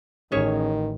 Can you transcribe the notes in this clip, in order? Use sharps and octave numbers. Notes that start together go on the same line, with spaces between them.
A1 D#3 C#4 G#4 C#5